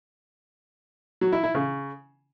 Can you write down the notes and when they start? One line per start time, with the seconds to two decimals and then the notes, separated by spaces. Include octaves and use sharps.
1.21 F#3
1.32 E4
1.44 E4
1.55 C#3